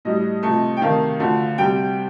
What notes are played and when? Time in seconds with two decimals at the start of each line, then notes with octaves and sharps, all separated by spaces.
0.05 A2 G3 D#5
0.43 C3 F3 A3
0.77 G5
0.81 C3 D#3 A3 F5
1.20 D3 F3 A3
1.58 C3 G3 G5